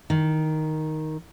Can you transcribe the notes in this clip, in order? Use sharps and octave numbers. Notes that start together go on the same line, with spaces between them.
D#3